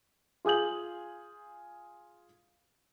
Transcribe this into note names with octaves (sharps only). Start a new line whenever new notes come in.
F4 G#4 D#6 G6 F#7